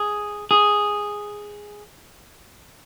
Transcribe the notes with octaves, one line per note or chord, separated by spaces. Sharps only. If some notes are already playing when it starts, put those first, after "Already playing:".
Already playing: G#4
G#4